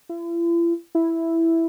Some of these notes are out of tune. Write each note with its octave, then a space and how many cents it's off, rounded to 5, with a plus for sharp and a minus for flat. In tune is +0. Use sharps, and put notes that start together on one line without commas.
E4 +45
E4 +0